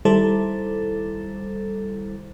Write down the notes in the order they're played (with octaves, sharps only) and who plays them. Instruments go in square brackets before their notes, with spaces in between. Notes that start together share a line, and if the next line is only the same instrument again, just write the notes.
[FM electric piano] D#3 G3 E4 A4 C5 A6